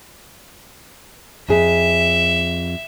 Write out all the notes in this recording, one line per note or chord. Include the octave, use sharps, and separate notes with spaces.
F2 G#4 E5